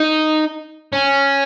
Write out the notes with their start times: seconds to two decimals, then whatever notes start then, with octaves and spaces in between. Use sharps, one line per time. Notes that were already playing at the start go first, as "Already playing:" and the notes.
Already playing: D#4
0.93 C#4